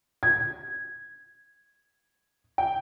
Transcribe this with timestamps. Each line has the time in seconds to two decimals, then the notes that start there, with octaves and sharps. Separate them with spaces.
0.23 G#6
2.58 G5